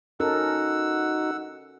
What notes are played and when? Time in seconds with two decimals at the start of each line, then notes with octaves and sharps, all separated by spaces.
0.20 C#4 D#4 F#4 A4 A#4 F#5 E6